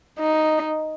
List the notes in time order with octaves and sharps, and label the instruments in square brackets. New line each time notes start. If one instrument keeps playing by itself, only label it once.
[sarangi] D#4